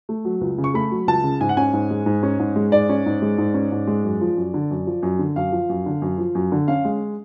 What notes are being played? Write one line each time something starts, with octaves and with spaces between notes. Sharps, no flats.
A3
F#3
C#2
C#3
C#6
A3 B5
F#3
C#2 A5
C#3
G#2 G#5
F#5
C#4 G#5
G#2
G#3
G#2
C#4
G#2
G#3
G#2 D5
C#4
G#2
G#3
G#2
C#4
G#2
G#3
F#2
F3
F#2
D3
F#2
F3
F#2
D3
F#2 F5
F3
F#2
D3
F#2
F3
F#2
D3
C#4 F5
G#3